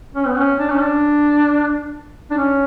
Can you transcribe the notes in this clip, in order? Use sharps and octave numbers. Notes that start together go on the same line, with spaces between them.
C#4
B3
C#4
D4
C#4
D4
D4
C#4